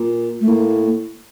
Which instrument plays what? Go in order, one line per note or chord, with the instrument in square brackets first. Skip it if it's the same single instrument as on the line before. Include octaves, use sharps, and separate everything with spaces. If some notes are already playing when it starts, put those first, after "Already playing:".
Already playing: [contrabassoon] A#2
[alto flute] A3
[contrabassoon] A2 [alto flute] A#3